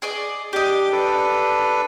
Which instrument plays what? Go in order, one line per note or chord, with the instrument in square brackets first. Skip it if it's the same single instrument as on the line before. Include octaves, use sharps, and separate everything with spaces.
[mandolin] G#4 D5 D#5
[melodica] D4 D6 [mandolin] G4 D#5
[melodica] D4 A4 B4